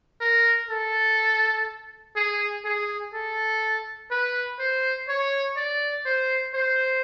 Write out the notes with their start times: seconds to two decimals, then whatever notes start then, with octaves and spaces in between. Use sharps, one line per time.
0.21 A#4
0.70 A4
2.16 G#4
2.65 G#4
3.14 A4
4.11 B4
4.59 C5
5.09 C#5
5.57 D5
6.06 C5
6.55 C5